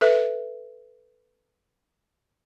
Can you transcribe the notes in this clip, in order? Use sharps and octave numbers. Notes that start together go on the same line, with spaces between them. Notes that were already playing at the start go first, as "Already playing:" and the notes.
A4 B4 E5